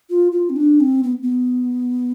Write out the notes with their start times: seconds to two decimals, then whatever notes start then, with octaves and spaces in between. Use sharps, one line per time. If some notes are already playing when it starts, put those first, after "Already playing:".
0.10 F4
0.32 F4
0.50 C4
0.56 D4
0.80 C4
1.03 B3
1.23 B3